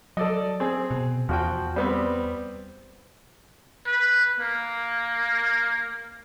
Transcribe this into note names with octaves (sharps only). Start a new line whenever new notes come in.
F#3 A4 D5 D#5
C4 G#4
B2
E2 F3 F#4 G5
G3 B3 C4
B4
A#3